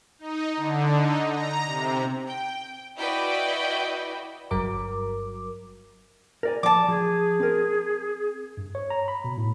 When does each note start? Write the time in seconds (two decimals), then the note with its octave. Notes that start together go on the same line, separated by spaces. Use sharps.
0.19 D#4
0.57 D3
0.96 D#4
1.29 A#5
1.65 C3
2.27 G5
2.97 E4 F#4 B4 D5 D#5 G5
4.51 G1 G2 F#3 A#4 D6
6.43 A#4 D5 G#5
6.63 F3 D5 A5 D6
6.88 F3 G#4
7.40 C4 A#4
8.57 G2
8.75 C#5
8.90 A#5
9.08 B5
9.24 B2
9.37 A2